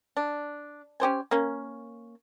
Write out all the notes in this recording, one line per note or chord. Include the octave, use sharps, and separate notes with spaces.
D4
C#4 G4 C5 G#5
A#3 C#4